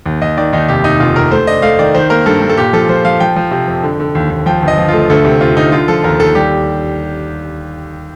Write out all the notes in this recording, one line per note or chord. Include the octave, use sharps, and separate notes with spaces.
D#2
D#2 D#5
D#3 D5
D#2 D#4
F1 G4
F1 D#4
F1 F4
F1 A#4
A3 C5
D4 D#5
A3 F5
D#3 D5
D#3 C5
A#3 A#4
G2 A4
G2
A4
A#2 G4
F3 A4
F3 C5
F3 F5
F3 G5
F3
C3
F2
D3
D3
D#2
D#2
F3 G5
G1
D#5
F3
A3 F4
D2 A4
C3
C3 F4
D2 D#4
D3 F4
F3 A4
D#2 A#4
D#2 A4
G3 G4